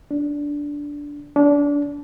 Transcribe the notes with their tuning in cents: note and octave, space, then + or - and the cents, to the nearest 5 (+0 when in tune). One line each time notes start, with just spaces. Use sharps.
D4 -10
D4 -25